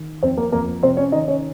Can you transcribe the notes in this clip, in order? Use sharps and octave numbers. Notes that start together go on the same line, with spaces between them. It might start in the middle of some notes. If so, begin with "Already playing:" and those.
Already playing: D#3
F2 C4 C5
A#3 A#4
F2 A#3 A#4
C3 C4 C5
C#4 C#5
D#3 D#4 D#5
C#4 C#5